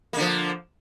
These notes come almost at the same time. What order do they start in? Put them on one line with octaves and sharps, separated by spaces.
A#3 D3 F3